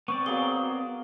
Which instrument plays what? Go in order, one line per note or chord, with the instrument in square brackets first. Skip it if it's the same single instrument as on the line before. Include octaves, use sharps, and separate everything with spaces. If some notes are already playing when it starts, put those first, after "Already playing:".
[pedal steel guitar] B3 C4 D5 [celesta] C#6
[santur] F#3 A#3 G#4 [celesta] G7